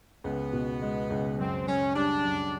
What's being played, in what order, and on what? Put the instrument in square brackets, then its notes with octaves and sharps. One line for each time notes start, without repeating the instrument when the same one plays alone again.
[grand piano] C#2 [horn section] B3
[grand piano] B2
G#3
C#2
[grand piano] F#2 [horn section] C4
[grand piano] F#2 [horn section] C#4
[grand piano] G3 [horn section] D4
[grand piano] F#2